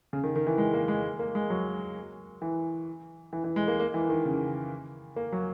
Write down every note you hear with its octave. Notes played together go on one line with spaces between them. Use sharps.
C#3
D#3
D#3
E3
G#3
A#3
G#3
A#3
G#3
F#3
E3
E3
E3
G#3
A#3
A#3
E3
D#3
C#3
A#3
F#3